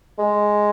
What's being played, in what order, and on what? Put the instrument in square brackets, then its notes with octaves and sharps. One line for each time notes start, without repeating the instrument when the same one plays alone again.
[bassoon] G#3